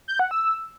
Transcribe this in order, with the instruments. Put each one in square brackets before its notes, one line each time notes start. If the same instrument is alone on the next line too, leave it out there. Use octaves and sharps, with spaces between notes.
[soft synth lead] G6
F#5
E6